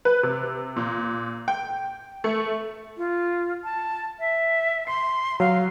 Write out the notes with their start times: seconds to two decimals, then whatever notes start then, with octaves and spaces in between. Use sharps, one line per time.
0.05 B4
0.23 C3
0.77 A#2
1.48 G5
2.24 A3
2.97 F4
3.64 A5
4.19 E5
4.87 C6 C7
5.40 F#3 F5